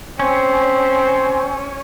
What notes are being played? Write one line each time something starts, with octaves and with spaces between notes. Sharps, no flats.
C4 C#4